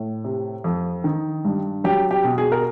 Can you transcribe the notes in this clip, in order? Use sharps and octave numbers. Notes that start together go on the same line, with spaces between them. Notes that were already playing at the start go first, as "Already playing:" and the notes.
Already playing: A2
C3
F2
D#3
G2
F#3 G4
G4
B2
G#4
A#4